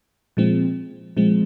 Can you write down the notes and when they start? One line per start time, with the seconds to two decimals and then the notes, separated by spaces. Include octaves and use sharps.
0.37 A#2 F3 G#3 C4
1.17 A#2 F3 G#3 C4